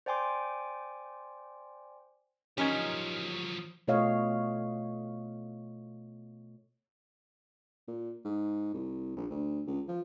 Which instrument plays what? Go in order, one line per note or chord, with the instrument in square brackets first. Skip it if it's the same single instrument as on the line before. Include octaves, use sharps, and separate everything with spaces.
[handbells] C5 D5 G5 G#5 C6 D6
[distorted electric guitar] F3 F#3 [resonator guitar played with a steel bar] C#4 D#4 [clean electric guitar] G4 A#4 G#5
[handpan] B2 A3 F4 C#5 D#5 F5
[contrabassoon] A#2
G#2
C2
A#1
D2
C#2
F3